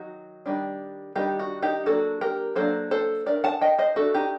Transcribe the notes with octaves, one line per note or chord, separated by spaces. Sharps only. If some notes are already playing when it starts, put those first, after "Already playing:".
Already playing: D#3 F#3 D#4 F#4
D#3 G3 D4
D#3 G3 D4 D#4 G4
F#4
D#4 G4
F#3 A#3 D4 F#4 A4
G4 A#4
F#3 A#3 D4 A4 C5
A4 C5
A3 D4 A#4 D5
F#5 A5
D#5 G5
C5 D#5
A3 D4 F#4 A4
D#4 G4